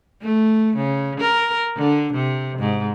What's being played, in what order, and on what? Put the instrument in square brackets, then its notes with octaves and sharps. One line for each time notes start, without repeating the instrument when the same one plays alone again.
[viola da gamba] A3
C#3
A#4
D3
C3
G#2